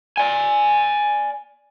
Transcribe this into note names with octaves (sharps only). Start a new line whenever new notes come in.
D5 G#5